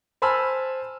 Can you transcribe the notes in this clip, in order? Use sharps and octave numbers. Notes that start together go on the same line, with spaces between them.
C5 G#5 A5 B5 E6 F6